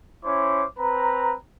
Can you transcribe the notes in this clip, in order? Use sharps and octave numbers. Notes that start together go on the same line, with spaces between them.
C#4 E4 C5 D6
C4 B4 A#5